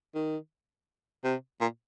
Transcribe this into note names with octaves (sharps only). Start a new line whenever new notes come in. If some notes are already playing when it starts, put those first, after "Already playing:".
D#3
C3
A#2